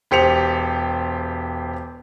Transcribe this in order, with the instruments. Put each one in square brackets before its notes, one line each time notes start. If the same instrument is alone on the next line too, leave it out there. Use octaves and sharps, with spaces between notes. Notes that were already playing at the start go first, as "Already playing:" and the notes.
[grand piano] E1 G4 C5 C#7 F7